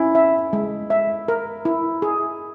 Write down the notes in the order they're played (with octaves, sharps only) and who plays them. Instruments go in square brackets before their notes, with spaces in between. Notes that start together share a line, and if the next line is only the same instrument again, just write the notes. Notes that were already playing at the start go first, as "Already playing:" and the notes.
Already playing: [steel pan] C#4 [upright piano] E4
[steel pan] E5
G#3
E5
A#4
E4
G#4